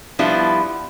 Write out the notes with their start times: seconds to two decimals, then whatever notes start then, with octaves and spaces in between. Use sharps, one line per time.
0.19 F3 G3 B3 D4 E4 F4